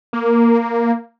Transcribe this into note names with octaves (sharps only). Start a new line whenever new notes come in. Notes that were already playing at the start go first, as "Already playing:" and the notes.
A#3